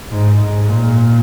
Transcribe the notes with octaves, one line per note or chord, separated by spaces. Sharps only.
G#2
G#2
A#2